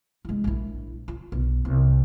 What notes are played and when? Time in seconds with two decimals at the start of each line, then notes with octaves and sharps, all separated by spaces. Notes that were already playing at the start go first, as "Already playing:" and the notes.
0.25 G#3 E4
0.44 A#1 E4
1.08 F4
1.32 B1
1.65 C2